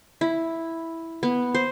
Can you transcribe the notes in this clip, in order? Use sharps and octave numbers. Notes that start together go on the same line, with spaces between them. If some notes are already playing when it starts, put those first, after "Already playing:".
E4
B3
C5